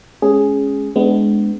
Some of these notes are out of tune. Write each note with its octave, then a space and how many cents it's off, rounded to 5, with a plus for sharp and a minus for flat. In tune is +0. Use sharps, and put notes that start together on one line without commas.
G#3 +15 C#4 +0 G#4 +0
G#3 +20 B3 +30 D4 +0